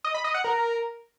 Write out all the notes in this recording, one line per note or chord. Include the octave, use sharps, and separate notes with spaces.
D#5
B5
D#5
F#5
A#4